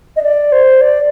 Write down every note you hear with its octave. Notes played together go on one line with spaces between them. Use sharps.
D#5
D5
C5
D5